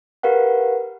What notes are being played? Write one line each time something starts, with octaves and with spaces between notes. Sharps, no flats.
G4 A#4 B4 F5 F#5